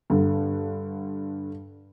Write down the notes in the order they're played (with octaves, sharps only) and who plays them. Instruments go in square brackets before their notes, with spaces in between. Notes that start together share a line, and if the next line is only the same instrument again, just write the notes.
[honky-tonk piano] G2 D3